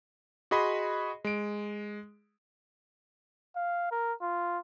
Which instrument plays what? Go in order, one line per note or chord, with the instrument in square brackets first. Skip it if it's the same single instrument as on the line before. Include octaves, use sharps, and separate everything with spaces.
[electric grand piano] F#4 G#4 D#5 B5 C6
G#3 D7
[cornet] F5
A#4
F4